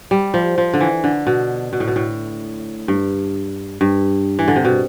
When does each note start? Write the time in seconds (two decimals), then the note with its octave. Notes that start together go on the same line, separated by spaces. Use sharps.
0.11 G3
0.34 F3
0.58 F3
0.74 D3
0.80 E3
1.04 D3
1.27 B2
1.73 B2
1.80 A2
1.88 B2
1.96 A2
2.88 G2
3.81 G2
4.39 E3
4.48 D3
4.56 C3
4.65 B2